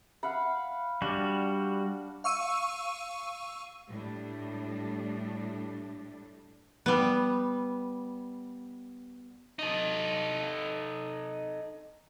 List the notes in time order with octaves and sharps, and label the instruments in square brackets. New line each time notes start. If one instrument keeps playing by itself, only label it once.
[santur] F5 F#5 B5
[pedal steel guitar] G3 F#4 [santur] D4
[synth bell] F5 C#6 E6 D#7
[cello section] A2 G3 A3 D4
[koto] G3 B3
[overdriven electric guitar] D#4 A4